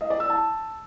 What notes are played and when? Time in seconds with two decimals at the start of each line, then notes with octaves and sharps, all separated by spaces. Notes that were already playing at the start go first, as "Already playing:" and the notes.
0.01 D#5
0.10 D5
0.20 E6
0.30 A5